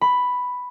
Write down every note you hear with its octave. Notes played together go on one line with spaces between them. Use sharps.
B5